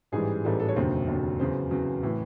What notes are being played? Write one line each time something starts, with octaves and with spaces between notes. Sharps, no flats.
A1 G#2 E3 G3 G#4
A1 G#2 E3 G3 A4
A4
C#5
F1 D#2 D3 F#3 C5
F1 D#2 D3 F#3
E2 C#3 F#3 C5
E2 C#3 F#3
A2 E3